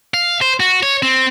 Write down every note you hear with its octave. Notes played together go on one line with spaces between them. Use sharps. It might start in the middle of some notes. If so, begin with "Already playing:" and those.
F5
C5
F#4
C#5
C4